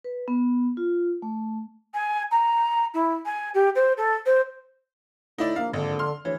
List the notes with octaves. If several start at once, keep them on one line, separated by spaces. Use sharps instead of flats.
B4
B3
F4
A3
G#5
A#5
E4
G#5
G4
C5
A4
C5
A2 D#4 E4 D5
A#1 A#3 F5
G#1 D3
C6 F6
D2 E3 C#5